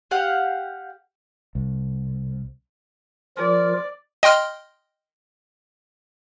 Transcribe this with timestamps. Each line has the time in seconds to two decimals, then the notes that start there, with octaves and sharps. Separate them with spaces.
0.11 G4 F5 F#5
1.55 C2
3.37 F3 F4 A#4 D5
4.23 D#5 G5 C6 F6